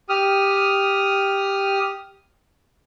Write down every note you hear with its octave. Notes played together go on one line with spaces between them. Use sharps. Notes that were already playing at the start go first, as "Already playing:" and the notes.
G4 D#6 F6